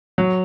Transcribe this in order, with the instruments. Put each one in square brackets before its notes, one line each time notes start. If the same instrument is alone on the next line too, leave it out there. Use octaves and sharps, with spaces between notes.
[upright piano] F#3